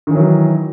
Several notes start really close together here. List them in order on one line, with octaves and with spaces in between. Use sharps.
D#3 E3 F#3